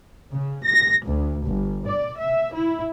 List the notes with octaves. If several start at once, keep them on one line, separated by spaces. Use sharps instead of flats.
C#3
A#6
D2
G1
D5
E5
E4